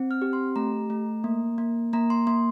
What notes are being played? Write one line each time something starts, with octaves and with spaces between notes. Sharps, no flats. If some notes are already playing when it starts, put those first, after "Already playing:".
Already playing: C4
F6
G4
C6
A3 A#5
A3
A#3
A#3
A#3 A#5
C6
A#3 C6